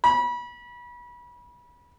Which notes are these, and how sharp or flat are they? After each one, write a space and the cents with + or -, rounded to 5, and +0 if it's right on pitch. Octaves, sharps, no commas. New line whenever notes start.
B5 -30